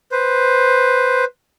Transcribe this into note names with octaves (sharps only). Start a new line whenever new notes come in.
B4 C5